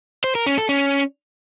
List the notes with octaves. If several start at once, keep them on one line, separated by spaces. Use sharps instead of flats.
C5
A#4
C#4
A4
C#4